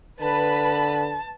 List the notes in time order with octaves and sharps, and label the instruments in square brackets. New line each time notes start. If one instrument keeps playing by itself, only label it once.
[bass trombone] D3 [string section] B4 B5 [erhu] A5